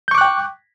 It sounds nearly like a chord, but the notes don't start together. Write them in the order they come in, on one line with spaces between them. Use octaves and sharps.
G6 C#6 D6 F#6 G5